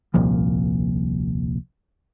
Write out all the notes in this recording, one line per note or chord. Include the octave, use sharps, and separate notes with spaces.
D#1 C2 A#2 F3